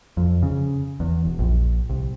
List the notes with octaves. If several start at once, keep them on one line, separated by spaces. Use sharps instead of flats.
F2
C#3
E2
E1
A#1
C2